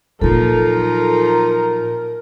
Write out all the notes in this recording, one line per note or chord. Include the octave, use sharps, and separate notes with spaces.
A#2 F3 F#3 D#4 F4 A4 A#4